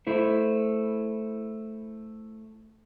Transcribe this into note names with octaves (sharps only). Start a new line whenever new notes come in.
A3 E4 C5